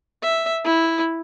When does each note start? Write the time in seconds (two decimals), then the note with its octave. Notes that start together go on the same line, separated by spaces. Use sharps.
0.22 E5
0.64 E4